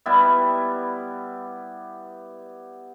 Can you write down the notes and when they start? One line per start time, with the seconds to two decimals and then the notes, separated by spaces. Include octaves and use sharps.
0.06 G3 B3 E4 E5